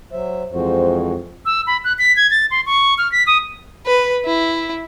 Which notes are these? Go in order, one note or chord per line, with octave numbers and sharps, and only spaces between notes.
F#3 C5 E5
F2 E3 G#3 F#4 C5
E6
B5
F#6
B6
G#6
A6
C6
C#6
F6
B6
D#6
B4
E4